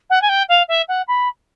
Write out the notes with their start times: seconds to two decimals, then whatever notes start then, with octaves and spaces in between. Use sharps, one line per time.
0.10 F#5
0.22 G#5
0.29 G5
0.49 F5
0.68 E5
0.88 F#5
1.08 B5